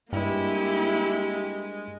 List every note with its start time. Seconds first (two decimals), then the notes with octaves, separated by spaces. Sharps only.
0.13 G2 G#3 A#3 E4 G4